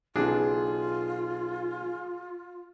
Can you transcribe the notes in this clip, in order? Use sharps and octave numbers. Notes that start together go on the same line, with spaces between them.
B1 C#3 E3 G3 D4 F4 G#4